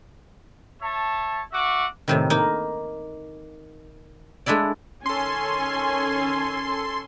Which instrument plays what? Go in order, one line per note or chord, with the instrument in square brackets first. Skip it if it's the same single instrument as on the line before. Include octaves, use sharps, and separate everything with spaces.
[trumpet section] C#5 E5 A5
F#4 E5 F#5 D6
[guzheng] A2 C3 D#3
A#3 D#4 A#4
G#3 A3 D4 E4 D5
[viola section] D#3 C#4 G#5 [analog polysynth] A4 C6